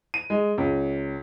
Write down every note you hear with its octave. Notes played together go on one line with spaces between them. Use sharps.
D#7
G#3
C#2